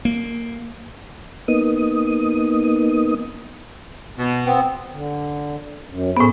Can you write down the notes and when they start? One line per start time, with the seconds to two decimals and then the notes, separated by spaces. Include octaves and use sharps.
0.05 A#3
1.48 A#3 B3 D#4 D#6
4.18 B2
4.46 B3 C4
4.91 D3
5.89 F#2
6.17 A2 B3 G#4 C5